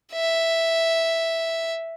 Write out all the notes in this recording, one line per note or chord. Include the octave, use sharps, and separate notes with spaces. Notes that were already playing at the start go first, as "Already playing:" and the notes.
E5